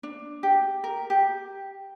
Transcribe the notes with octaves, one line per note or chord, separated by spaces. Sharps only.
D4
G4
A#4
G4